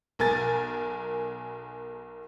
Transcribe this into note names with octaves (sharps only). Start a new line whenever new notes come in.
B1 A#4 G#5 A6